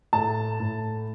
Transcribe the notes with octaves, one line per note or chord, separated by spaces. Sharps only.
A2 A5
A2